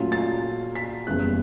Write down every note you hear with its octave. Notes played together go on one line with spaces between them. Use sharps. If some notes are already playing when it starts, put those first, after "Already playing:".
Already playing: A#2 F#3 A3 C#4 F4
A6
B6
F#1 E2 C#3 E3 G3 F#6